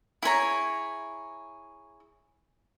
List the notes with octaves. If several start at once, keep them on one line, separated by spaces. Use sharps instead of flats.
E4 G#4 C#5 A#5